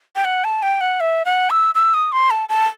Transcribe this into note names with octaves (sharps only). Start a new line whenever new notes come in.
G5
F#5
A5
G5
F#5
E5
F#5
E6
E6
D#6
C6
A5
A5